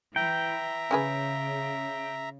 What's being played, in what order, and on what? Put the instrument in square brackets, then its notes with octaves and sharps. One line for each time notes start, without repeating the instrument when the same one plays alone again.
[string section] E3 [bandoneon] E5 A#5 [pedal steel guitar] G5
[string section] C#3 [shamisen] C#4 G#4 B4